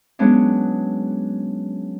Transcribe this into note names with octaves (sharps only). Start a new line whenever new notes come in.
F#3 G#3 B3 C#4 D4